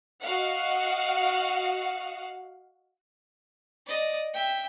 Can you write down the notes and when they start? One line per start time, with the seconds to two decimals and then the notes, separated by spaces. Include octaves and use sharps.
0.22 F#4 D#5 F5 F#5
3.87 D5 D#5
4.34 E5 G5